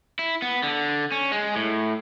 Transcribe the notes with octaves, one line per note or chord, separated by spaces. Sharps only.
E4
B3
D3
C#4
G#3
A2